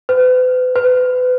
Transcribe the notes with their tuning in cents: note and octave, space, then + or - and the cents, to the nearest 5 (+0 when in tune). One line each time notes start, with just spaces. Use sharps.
B4 +40
B4 +30